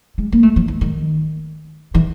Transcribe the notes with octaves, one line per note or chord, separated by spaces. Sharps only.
G#3
A#3
A3
F3
E3
D#3
E3